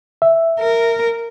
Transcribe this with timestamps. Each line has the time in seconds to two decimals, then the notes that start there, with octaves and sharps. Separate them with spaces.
0.22 E5
0.60 A#4